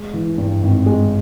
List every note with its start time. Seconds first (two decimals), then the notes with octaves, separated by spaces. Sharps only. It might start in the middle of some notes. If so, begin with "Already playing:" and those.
Already playing: G#3
0.14 E3
0.38 G2
0.62 G#1
0.86 G#3